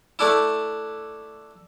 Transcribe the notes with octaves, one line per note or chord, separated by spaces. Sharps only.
A3 D4 E4